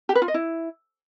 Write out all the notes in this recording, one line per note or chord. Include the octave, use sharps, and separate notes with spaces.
G4
B4
F4
D#5
E4